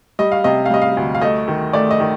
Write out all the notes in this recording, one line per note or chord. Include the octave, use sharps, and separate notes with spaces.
G3 D#5
F5
C3 D#5
F5
G3 D#5
F5
D2
F5
A3 D#5
D#3
A3 D5
D#5
D#3